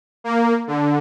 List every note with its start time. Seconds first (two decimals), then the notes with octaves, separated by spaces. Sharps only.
0.24 A#3
0.67 D3